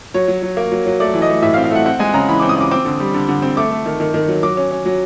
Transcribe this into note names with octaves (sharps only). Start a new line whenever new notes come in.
F#3 C#5
F#3
F#3
A#3
F#3
F#3
A3 D5
E3
D#5
A3
A2 E5
F5
C4
F5
A3 F#5
C4 F#5
G#3 G#5
C#3 A#5
E3 B5
C4 D6
D#6
C#3 D6
C4 D6
D3
G3
D3
D3
C4
A3 D6
A3
D#3
D#3
D#3
F#3
F#3 D6
C#4
C#4
F#3